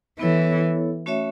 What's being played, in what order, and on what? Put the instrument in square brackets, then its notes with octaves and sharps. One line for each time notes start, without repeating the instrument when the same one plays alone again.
[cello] E3 [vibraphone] B3 E4 A4 C#5
[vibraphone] A3 C#4 F#4 C#5 E5